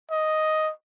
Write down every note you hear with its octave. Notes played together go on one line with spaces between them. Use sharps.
D#5